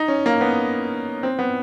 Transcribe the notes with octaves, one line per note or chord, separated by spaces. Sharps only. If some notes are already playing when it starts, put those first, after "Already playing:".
Already playing: D#4
C#4
A#3
B3
C4
B3